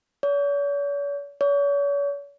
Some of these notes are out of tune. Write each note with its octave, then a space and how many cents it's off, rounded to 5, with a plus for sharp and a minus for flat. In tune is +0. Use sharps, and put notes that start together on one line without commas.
C#5 +45
C#5 +40